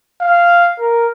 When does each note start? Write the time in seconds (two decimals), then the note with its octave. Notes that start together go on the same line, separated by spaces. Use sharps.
0.21 F5
0.79 A#4